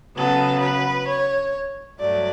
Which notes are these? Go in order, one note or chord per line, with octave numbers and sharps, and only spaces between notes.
C#3 F#3 B3 A4
B4
C#5
G2 F#3 A3 D5